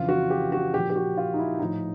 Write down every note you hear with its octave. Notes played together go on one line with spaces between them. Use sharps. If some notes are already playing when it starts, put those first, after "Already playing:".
Already playing: F2 C#3 E3 F4
F#4
G4
F#4
A#2 F3 G4
G4
F#4
F4
D#4
E4
A2 F3 D#4